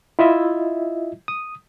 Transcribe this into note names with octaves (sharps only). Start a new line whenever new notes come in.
E4 F4 D#5 E5
D#6